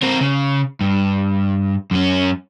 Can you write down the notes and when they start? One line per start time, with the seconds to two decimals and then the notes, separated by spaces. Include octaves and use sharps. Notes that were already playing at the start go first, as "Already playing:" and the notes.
0.02 C4 A#4
0.21 C#3
0.81 G2
1.91 F#2 C#4